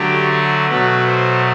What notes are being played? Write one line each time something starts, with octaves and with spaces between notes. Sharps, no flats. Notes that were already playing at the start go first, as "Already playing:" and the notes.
Already playing: D3 F#3 A3 G4
F#4
B2 F#3 A3 B4
C5